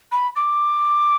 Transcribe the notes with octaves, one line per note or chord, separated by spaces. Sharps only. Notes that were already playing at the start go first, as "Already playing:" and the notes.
B5
D6